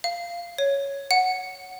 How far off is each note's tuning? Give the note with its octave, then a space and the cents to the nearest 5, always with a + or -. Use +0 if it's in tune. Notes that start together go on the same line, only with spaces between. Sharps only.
F5 -10
C#5 +5
F#5 +0